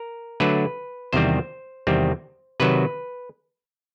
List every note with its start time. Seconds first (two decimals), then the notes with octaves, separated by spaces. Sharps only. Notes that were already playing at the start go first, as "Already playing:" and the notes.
Already playing: A#4
0.40 D3 F#3 A3 D4 B4
1.13 E2 C3 D#3 G3 C4 C5
1.87 E2 C3 D#3 G3 C4
2.60 C3 D#3 F#3 B4